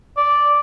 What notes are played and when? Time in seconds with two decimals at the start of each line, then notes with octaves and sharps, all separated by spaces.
0.17 D5